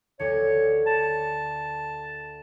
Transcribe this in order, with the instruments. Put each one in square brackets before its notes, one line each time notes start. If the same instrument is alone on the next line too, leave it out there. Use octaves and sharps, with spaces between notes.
[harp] D2 D3 [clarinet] C#5
[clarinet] A5